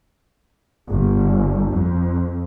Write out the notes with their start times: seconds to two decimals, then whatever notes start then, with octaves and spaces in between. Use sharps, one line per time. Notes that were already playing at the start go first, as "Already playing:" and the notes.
0.89 G1
1.72 F2